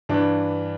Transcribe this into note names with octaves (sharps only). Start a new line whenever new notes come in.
G2 E3 D4